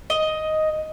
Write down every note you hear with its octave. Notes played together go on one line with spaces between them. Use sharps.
D#5